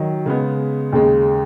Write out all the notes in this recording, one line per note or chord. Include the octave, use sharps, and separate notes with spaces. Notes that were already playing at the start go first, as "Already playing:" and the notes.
Already playing: D#3 F#3
C#3 G#3 B3
D#2 C#3 G#3